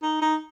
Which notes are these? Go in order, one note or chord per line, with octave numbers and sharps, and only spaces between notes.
D#4
D#4